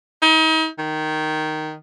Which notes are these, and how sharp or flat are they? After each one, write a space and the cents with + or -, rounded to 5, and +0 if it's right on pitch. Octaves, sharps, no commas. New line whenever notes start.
D#4 +40
D#3 -5